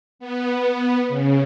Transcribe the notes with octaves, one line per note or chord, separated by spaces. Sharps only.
B3
C#3